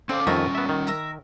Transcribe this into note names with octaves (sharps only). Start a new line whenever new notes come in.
C4 C#4 A4 D5 F5
F2 D#3 G3 C#4 F4 A#4 C#5 E5
B3 E5
D#3
A#4 E5 A#5